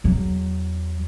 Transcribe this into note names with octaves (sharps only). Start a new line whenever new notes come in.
E2 F#3